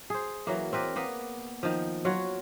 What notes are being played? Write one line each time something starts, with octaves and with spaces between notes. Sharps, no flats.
G#4 C5
E3 F#3 A#3
C4 A#4 B4 D5
A#3 B3 B4
D#3 F3
F#3 F4 C#5 F#5